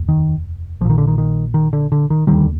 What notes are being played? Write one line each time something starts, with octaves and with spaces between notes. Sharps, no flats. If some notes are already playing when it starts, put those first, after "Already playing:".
Already playing: F1 D#2
D#3
A#1 A#2 D#3 F3
D3
D#3
D#3
D#3
D3
D3
D#3
F1 D#2 D3 D#3 G3